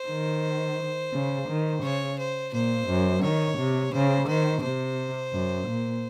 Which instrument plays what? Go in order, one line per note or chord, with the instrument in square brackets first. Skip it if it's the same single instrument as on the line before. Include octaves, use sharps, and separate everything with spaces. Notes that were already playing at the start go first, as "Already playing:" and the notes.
Already playing: [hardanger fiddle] C5
[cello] D#3
C#3
D#3
[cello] C#3 [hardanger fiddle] C#5
[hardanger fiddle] C5
[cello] A#2 [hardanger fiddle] C5
[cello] F#2
[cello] D#3 [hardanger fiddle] C#5
[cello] C3
[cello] C#3 [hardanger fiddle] C5
[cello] D#3 [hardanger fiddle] C5
[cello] C3 [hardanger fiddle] C5
[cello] F#2
A#2